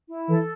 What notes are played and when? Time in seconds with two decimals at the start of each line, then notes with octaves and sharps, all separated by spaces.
0.08 E4
0.28 E3 A4